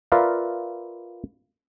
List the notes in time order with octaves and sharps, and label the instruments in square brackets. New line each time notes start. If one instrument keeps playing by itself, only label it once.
[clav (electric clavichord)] F4 A#4 B4 D5 E5 F5